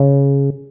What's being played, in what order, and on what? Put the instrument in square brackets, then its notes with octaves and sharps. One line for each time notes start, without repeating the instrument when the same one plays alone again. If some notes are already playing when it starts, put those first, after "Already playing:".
Already playing: [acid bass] C#3